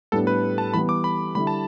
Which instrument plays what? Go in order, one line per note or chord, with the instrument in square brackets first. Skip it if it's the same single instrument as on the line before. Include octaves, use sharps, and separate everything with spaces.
[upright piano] A2 G3 B3 D4 [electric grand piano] A4
[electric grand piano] B4
A5
[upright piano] E3 G3 B3 [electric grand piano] B5
[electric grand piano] D6
B5
[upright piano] D3 G3 E4 [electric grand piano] B5
[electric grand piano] A5